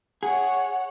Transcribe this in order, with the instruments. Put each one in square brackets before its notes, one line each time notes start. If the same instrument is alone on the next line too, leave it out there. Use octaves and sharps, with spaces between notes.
[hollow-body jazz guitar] G#4 [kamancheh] C#5 F#5